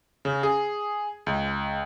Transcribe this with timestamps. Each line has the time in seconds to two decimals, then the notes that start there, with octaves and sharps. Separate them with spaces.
0.25 C#3
0.43 G#4
1.26 C#2